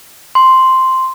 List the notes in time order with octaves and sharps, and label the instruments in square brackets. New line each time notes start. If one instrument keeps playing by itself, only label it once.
[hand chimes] C6